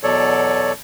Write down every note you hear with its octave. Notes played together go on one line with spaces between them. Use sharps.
E2 B2 F#3 A4 C#5 D5